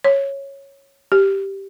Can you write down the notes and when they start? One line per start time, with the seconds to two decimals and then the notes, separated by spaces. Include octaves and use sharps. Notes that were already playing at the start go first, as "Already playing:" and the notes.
0.04 C#5
1.12 G4